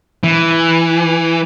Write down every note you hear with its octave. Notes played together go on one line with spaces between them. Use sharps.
E3